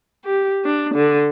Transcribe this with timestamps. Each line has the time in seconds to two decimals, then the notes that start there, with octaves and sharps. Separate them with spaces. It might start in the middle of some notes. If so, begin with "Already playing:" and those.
0.24 G4
0.65 D4
0.94 D3